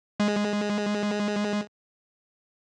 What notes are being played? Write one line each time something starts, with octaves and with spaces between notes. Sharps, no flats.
G#3